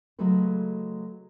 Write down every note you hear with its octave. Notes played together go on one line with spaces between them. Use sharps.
C#3 F#3 G#3 A3 A4 B4